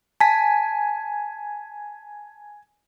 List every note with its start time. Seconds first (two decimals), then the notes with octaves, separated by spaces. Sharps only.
0.20 G#5 A5 B6